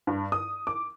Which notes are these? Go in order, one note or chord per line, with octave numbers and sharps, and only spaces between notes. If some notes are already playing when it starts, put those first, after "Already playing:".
G2
D#6
D6